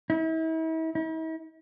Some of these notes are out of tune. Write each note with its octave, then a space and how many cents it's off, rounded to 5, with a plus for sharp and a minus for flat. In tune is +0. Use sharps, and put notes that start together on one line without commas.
E4 -40
E4 -45